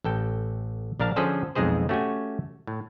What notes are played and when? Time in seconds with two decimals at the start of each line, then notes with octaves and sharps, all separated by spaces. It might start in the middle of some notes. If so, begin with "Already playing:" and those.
0.04 A1 A4 G5
1.00 A#1 D4 A#4 F5 A5
1.16 D3 F3 C#4 G#4 A4 C5
1.55 B1 F2 G#3 D#4 G#4 C5
1.89 A3 C#4 F#4 G4 G5 G#5
2.67 A2